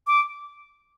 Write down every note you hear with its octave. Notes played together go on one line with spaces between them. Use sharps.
D6